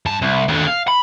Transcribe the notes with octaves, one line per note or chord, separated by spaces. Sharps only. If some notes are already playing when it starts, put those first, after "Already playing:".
G2 A5
C2
D#2 D3
F5
B5